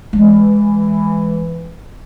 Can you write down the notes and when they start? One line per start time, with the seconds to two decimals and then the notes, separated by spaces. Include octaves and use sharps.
0.13 E3 G#3